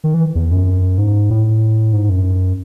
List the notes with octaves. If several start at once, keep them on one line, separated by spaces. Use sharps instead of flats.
D#3
E3
E2
F#2
G#2
A2
G#2
F#2